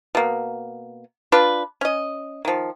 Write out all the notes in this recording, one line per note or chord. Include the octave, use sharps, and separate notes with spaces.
B2 A#3
D4 F4 B4
C#4 D#5
D#3 F3